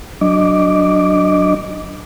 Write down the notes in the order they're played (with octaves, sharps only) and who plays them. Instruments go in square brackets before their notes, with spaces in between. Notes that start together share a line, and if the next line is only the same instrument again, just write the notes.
[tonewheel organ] F#3 D4 D#5 D6